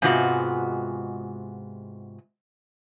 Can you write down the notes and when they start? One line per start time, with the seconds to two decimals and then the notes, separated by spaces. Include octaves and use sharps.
0.02 G#2 C3 G#3 B3 F4 F#4